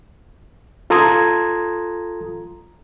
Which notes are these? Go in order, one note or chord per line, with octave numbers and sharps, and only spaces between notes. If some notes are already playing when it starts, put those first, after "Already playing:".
F4 A4 A#5 C6 D#6 G#6